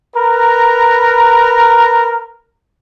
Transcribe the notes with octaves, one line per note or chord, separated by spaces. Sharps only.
A#4 B4 A#5